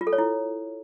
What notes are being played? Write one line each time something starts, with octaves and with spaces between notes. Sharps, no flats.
F4
A4
C#5
E4